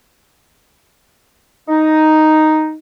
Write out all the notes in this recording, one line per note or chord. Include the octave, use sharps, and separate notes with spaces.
D#4